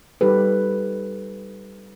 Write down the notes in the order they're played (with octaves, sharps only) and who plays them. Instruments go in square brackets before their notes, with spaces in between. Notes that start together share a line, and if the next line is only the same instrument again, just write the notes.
[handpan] G3 D#4 G4 A4 B4